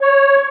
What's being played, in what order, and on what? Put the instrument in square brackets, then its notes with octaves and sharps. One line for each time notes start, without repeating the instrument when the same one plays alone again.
[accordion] C#5